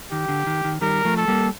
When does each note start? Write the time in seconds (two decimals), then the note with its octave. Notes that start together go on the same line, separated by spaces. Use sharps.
0.11 D#3 G4
0.28 D3
0.47 D#3
0.64 D#3
0.81 D#3 G3 A#4
1.05 F3 A3
1.17 A4
1.28 G3 A#3